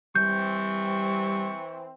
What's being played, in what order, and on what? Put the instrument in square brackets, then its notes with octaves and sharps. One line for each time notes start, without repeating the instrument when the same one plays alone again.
[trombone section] E3 C4 [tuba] G3 [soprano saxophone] C#6 [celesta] G6